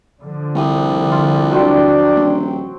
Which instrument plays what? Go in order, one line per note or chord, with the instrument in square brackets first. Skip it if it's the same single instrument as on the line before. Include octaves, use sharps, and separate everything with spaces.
[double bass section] D3 F3
[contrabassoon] C2 [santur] C#5 D#6
[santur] F4
[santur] F#3 C4 G5 [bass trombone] D4
[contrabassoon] D#1